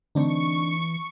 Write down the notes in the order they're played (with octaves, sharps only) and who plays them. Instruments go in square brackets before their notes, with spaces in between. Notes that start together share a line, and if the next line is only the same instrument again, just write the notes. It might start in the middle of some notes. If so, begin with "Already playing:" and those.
[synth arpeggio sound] D3 A3 C4 [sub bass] E3 [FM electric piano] D4 D#4 [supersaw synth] C#6